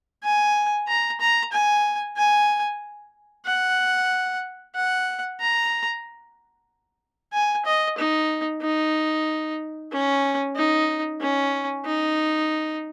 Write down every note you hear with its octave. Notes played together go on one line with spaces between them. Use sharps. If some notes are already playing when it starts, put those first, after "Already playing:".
G#5
A#5
A#5
G#5
G#5
F#5
F#5
A#5
G#5
D#5
D#4
D#4
C#4
D#4
C#4
D#4